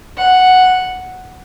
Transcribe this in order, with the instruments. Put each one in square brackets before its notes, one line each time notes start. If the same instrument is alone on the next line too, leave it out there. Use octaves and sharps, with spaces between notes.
[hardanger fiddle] F#5